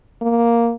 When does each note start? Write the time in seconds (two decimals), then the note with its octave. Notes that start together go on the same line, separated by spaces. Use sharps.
0.22 A#3